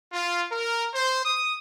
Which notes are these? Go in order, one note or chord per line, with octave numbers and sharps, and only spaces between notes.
F4
A#4
C5
D#6